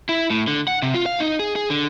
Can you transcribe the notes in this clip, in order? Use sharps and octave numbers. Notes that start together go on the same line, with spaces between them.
E4
A2
D3
F#5
C3
F4
F5
D#4
G#4
G#4
D3